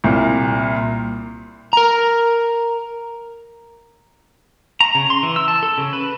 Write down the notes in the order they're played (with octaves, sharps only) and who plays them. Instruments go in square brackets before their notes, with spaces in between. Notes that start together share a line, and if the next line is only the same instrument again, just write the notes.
[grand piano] C2 A#2
[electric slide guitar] A#4 A#5
[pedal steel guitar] A#5
C#3
C6
E3
E6
A5
A4
C#3
B4